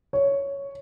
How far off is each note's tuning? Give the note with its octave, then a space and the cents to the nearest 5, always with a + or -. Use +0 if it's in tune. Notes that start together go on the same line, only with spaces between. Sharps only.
C#5 +5